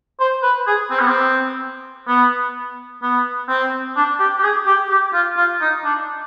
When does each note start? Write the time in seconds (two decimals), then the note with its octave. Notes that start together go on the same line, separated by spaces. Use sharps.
0.20 C5
0.43 B4
0.67 G#4
0.90 C4
0.99 B3
1.08 C4
2.08 B3
3.02 B3
3.49 C4
3.96 D4
4.20 G4
4.39 G4
4.43 G#4
4.66 G4
4.90 G4
5.13 F4
5.37 F4
5.61 D#4
5.84 D4